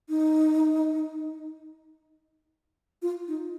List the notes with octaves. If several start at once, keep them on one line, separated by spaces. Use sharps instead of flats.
D#4
F4
D#4